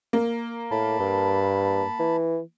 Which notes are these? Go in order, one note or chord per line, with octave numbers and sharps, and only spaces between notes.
A#3
A2 A5 B5
G2
E3